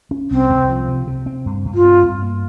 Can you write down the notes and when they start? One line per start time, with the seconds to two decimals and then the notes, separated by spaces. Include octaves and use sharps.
0.11 C#4
0.31 C2 C4
0.50 C2
0.69 F3
0.88 C3
1.07 C3
1.26 C4
1.46 G2
1.65 G2
1.75 F4
1.85 C4
2.03 G2
2.23 A#3